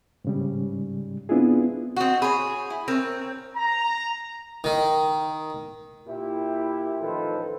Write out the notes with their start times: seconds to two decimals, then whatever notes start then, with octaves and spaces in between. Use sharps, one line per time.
0.25 G#2 C#3 G3
1.29 B3 C4 D4 E4 F4 G#4
1.96 C4 F#4 D#5 F#5
2.22 G#4 C#5 B5
2.70 E4
2.88 C4 A#4 C#5
3.56 A#5
4.64 D#3
6.06 A#2 E4 G4
7.01 A1 D#3 F3 A4 B4 C5